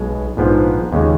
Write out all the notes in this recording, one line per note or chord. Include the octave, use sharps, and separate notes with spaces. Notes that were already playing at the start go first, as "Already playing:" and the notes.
Already playing: B1 B2 G#3
A#1 G#2 F3 B3
D#2 C#3 G#3